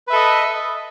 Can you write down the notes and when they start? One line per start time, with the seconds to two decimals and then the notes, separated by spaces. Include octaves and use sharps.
0.07 B4
0.10 E5
0.13 A4
0.15 D#5